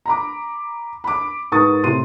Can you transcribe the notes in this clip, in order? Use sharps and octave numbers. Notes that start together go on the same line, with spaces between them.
A#5 B5 D6
B5 D6
G#2 A#4 B4 C#6 D#6 A6
A2 C3 C6 D#7